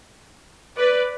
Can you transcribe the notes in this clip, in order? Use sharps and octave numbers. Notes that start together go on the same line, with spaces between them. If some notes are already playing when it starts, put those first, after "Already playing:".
B4 D5